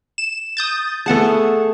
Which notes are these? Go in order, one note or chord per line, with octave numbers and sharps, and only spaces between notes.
E7
D#6 G6 A6
A3 B3 G#4 F#5 A5